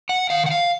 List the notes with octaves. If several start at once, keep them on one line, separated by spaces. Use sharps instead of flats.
F#5
D#3 F5
F#5
F5